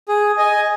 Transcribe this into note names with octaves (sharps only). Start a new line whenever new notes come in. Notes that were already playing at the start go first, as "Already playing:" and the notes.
G#4
D#5 G#5